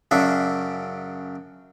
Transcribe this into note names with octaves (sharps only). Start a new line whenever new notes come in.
F#2 C#3 D4 E5